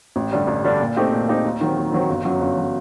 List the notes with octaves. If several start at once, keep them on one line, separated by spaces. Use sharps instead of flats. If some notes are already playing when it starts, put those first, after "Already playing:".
A1
G2 D3 G3 D4
A1
G2 D3 G3 D4
A#2
A3 C4 D#4 G4
A#2
A3 C4 D#4 G4
D#2
D#3 F#3 C4
D#2
D#3 F#3 C4
G1
F#2 F#3
G1
F#3